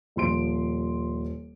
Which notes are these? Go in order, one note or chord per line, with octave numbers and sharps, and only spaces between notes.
D#1 F3 C6 D7